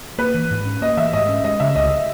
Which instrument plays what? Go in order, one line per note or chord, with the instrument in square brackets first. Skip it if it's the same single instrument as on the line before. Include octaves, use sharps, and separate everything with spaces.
[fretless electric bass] A#3 [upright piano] B4
[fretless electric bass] E3
G#2
C#4
[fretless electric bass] A#3 [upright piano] D#5
[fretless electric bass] E3 [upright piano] E5
[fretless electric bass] G#2 [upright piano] D#5
[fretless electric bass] C#4
[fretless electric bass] G#3 [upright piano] D#5
[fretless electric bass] C#3 [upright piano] E5
[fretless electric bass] C#2 [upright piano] D#5